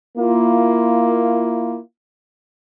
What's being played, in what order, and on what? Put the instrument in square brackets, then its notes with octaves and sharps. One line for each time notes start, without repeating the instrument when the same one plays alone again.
[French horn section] A#3 E4 F4